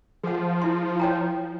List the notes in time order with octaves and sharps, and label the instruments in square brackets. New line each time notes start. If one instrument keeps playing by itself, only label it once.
[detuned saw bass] F3 [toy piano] G#4 F#5
[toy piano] E4 C6
C#5 G5 A#5